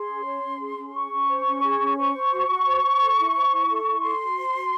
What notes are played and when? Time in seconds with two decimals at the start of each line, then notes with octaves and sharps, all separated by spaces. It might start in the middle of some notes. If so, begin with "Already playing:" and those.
Already playing: G#4 C6
0.09 C#4
0.26 C#5
0.43 C#4
0.60 G#4
0.78 C#4
0.94 G#4 C#6
1.12 C#4
1.29 C5
1.46 C#4
1.63 G#4
1.80 C#4
1.98 C5 C#6
2.14 C5
2.32 F#4
2.49 F#4
2.66 C5
2.83 C5
3.00 A4
3.17 E4
3.35 C5
3.52 E4
3.69 A4
3.86 E4
4.03 A4 C6
4.20 F#4
4.38 C5
4.54 F#4